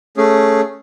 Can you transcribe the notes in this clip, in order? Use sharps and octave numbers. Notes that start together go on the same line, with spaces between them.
A3 C#4 G#4